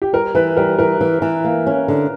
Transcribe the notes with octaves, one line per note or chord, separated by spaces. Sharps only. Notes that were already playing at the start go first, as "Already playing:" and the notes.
G4
G3 A#4
E3 B4
G3 A#4
E3 A#4
E3
E3
A#3
C#4
D3